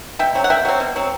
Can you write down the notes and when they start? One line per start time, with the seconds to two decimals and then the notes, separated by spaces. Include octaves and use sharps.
0.19 B2 E5 G5
0.35 F#3 C4
0.44 F#5
0.50 B2 E5 G5
0.65 F#3 C4
0.80 B2
0.96 F#3 C4